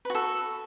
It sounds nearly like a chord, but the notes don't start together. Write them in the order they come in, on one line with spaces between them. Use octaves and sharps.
B4 F#4 A4